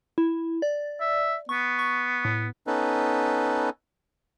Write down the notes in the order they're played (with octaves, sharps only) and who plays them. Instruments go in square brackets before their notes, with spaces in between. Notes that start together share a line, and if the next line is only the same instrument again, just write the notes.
[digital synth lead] E4
D5
[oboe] E5
[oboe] B3 [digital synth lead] C#6
[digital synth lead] C#6
A2
[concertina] B3 C#4 D#4 A4 B4